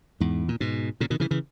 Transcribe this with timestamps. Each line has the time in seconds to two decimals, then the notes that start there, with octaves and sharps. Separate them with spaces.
0.20 E2 G#2
0.48 A#2
0.60 G#2 B2
1.00 A#2 C#3
1.10 B2 D#3
1.20 C#3 E3
1.31 C#3 E3